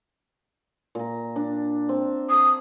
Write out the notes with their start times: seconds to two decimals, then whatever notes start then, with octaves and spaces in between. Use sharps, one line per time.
0.95 A#2 A#5
1.36 D4
1.89 C4
2.30 D#6